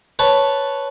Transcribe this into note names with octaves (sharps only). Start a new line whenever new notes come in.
B4 C#5 A5